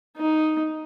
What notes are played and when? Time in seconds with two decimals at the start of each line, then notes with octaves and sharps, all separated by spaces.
0.17 D#4